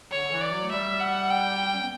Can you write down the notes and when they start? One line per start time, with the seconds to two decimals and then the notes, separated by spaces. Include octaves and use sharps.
0.11 D3 C#5
0.31 E3
0.42 D5
0.51 F#3
0.62 A3
0.71 G3 E5
1.01 F#5
1.31 G5
1.74 C#4
1.82 B3